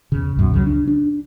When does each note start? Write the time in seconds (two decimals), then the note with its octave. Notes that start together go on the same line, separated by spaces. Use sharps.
0.12 E2 C#3
0.37 C#2 F#2 B2
0.52 C#2 C#3 F#3
0.67 D4
0.88 D4